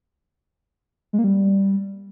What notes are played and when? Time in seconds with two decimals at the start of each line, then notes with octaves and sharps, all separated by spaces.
1.13 G#3
1.19 A#3
1.24 G3